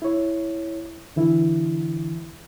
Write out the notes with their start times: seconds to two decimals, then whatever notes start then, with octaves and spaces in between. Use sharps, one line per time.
0.02 E4 C#5
1.16 D3 E3 E4